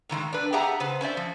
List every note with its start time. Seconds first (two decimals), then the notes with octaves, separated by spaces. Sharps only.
0.09 A2 D#3 F3 G#3
0.33 D4 B4
0.53 G4 G#4 E5 F#5 A5 A#5
0.80 C#3 B4 C5
1.01 C#4 C5 D5 E5
1.17 F3